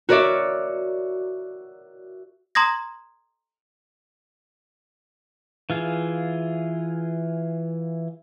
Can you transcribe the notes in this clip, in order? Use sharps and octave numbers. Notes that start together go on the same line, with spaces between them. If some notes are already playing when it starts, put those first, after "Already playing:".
F#4 A#4 C#5 D5 E5
A#5 C6 D#6 G#6 A#6
E3 F4 G#4